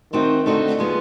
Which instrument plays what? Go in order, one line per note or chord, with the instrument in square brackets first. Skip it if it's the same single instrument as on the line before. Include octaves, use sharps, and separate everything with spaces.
[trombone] D#3 [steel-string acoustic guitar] A3 C4 D#4 F#4
[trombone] D3 [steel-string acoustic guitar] A3 C4 D#4 F#4
[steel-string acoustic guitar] F3 G#3 B3